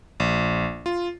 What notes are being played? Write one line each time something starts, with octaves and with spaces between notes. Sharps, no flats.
A#1
F4